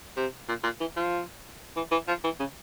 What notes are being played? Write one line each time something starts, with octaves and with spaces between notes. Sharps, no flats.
C3
A#2
A#2
E3
F3
E3
E3
F3
E3
C#3